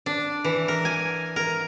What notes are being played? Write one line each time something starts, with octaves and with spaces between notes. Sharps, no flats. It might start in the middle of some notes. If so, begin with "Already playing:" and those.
D4
E3
A#4
G#5
A#4